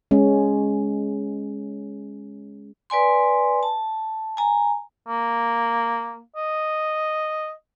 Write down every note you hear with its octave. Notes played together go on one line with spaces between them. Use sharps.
G#3 C#4
B4 D5 G#5 C6
A5
G#5 A#5
A#3
D#5